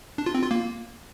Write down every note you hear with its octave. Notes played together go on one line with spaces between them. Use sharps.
D4
F4
C4
F4
A#3